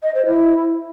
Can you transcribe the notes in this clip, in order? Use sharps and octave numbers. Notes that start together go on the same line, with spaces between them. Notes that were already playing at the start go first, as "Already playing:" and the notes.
D#5
C5
E4